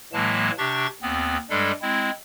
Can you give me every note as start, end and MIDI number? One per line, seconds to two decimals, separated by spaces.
0.13 0.51 45
0.13 0.51 52
0.13 0.51 54
0.13 0.51 56
0.13 0.51 58
0.13 0.51 81
0.58 0.87 48
0.58 0.87 62
0.58 0.87 67
0.58 0.87 85
0.58 0.87 93
1.02 1.37 39
1.02 1.37 59
1.02 1.37 60
1.50 1.72 43
1.50 1.72 55
1.50 1.72 56
1.50 1.72 62
1.50 1.72 69
1.82 2.10 56
1.82 2.10 60
1.82 2.10 64